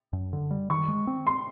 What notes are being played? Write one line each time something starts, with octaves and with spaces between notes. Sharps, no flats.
F#2
D3
G3
D#3 C#6
G#3
C4
C6